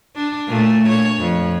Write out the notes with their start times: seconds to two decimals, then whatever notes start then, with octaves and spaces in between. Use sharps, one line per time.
0.16 D4
0.47 A#2 A3
0.89 C#5
1.19 F2